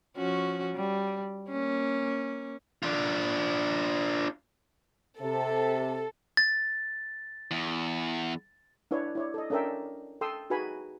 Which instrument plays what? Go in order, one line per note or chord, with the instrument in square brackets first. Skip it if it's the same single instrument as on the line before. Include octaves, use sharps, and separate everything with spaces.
[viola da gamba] F3 C#4 F#4
G3
A#3 C#4
[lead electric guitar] D4 F4
[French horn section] C3 [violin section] A4
[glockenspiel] A6
[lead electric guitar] E2
[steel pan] D4 E4 B4 C#5
E4 C#5 D5
A4 D#5
C#4 D4 A4 A#4 E5 G5
A4 G5 C6 D#6 E6
D#4 F#4 G#4 B4 G#5 B5